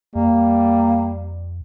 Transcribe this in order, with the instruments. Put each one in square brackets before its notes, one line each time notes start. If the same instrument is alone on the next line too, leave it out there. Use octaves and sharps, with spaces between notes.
[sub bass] F2 [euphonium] G3 [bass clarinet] A#3